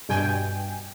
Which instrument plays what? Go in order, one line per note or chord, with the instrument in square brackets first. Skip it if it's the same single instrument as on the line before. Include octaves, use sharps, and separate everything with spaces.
[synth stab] G2 B2 G5 G#5